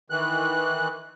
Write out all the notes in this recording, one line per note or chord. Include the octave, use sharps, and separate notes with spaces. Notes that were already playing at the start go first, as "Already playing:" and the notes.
D#3 E3 F#6